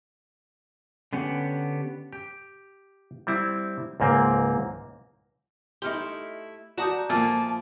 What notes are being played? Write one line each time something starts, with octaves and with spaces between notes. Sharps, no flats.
D3 B3 C#4 G4 F#5
G4
G3 C4 E4
C#2 G#2 A#3 C4
A3 D#4 E4 G4 C6 F6
F#4 D5 A5 A#5 D#6 G6
A#2 F3 A3 B3 A5 F6 A6